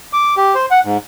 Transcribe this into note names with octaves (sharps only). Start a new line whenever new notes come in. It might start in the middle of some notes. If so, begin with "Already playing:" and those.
D6
G4
C5
F#5
G#2